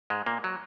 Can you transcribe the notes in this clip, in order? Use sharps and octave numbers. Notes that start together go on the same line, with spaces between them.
G#2 G#3
A#2 A#3
F#3